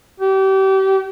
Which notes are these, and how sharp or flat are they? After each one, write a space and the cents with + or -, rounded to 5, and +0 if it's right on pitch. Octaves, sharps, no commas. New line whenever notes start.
G4 -30